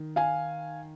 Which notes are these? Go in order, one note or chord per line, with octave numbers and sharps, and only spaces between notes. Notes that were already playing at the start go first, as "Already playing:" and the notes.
Already playing: D#3
F5 G#5